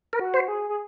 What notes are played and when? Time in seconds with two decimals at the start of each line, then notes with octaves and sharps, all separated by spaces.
0.13 A#4
0.20 F#4
0.34 C5
0.48 G#4
0.69 G#4